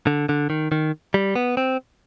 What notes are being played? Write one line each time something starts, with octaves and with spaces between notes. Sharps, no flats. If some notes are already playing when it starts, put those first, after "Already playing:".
D3
D3
D#3
D#3
G3
B3
C4